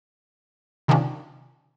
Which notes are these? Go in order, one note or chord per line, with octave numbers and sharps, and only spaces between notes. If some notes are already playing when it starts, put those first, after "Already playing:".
C3 D#3 F3 A#3 C#4 D4